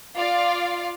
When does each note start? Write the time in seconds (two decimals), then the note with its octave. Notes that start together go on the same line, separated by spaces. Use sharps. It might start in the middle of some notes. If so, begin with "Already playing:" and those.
0.17 F4 D5 F5